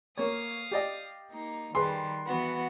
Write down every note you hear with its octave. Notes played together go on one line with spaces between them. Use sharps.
A#3 C#5 F5 D#6
G4 D5 D#5
A#3 D#4
D#3 G3 G#4 B4 C6
E3 B3 F#4